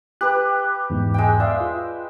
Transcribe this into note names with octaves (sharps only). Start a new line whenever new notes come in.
G4 B4 F#6
E2 G#2
G#3 G5
D5 E5 F5
F4